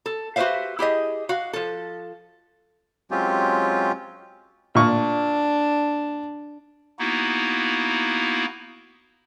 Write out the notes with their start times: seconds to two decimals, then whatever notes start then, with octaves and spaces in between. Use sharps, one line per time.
0.06 A4
0.36 F#4 G4 B4 C5 E5 F5
0.79 E4 G4 G#4 D#5
1.29 F#4 F5
1.53 F3 A4
3.11 F#3 G#3 C4 C#4 F4 G4
4.75 A#2 D4 C#6
6.99 A#3 B3 D#4 E4 F#4